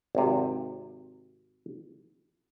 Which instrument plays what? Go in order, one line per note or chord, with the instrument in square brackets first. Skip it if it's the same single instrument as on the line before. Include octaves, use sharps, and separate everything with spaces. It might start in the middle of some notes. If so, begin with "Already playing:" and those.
[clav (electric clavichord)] G#1 C3